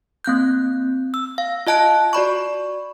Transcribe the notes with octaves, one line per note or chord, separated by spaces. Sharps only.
A#3 C4 F#6 G6
E6
F5
F4 D#5 A5 F#6 D7
F#4 D5 B5 C#6